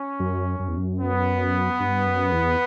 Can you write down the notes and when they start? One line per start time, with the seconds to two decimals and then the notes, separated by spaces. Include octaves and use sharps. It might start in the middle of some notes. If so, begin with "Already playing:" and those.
Already playing: C#4
0.20 F#2
0.59 F#2
0.68 E2
0.77 F#2
1.00 B3
1.80 G2
2.06 F#2
2.32 E2